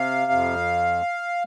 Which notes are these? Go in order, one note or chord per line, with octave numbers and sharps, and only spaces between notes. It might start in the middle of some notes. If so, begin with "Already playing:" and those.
Already playing: C3 F5
F2